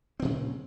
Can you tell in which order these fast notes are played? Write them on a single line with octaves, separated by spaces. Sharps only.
C4 C#3 A#2 F#3